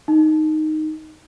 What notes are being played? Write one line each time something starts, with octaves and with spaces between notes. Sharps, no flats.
D#4